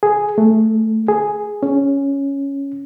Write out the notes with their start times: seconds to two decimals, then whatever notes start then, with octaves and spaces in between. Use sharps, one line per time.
0.03 G#4
0.38 A3
1.08 G#4
1.63 C#4